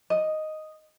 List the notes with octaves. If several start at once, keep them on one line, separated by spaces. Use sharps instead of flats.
D#5